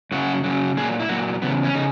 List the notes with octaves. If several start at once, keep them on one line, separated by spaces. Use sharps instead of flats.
F#2 C#3 F#3 F#4
F#2 C#3 F#3
A#2 F#3 G#4
E4
A#2 F#3 F#4
E2 C#3 B3
C#4
C#3 D#4